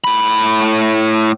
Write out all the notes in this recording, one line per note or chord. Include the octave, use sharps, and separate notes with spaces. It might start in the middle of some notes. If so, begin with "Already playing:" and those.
A2 B5